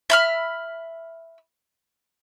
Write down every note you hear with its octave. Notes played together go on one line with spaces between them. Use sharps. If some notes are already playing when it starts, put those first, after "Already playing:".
E5 B5 F6